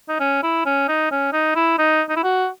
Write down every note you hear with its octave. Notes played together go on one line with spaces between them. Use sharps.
D#4
C#4
E4
C#4
D#4
C#4
D#4
E4
D#4
D#4
E4
F#4